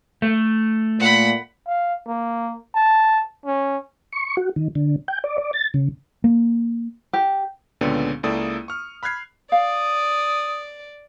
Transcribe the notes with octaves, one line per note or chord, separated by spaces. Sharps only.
A3
A#2 F#5 B5
F5
A#3
A5
C#4
C#6
F#4
D#3
D3
G5
D5
D5
A6
C#3
A#3
G4
C#2 A#2 D3 B3 C#4 D5
C#2 A#3 E4 A4 D5 D#6
C#6 F6
B5 F6 F#6 G#6 C7
D5 F5 D#6